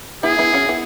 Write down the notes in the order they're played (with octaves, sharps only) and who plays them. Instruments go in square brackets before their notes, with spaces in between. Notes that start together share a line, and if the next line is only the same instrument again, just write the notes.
[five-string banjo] B3 E4 [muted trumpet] G#4
[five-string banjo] B3 E4
C#4 F#4
B3 E4